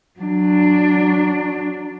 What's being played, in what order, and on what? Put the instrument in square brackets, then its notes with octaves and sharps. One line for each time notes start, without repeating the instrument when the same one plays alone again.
[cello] F#3 D4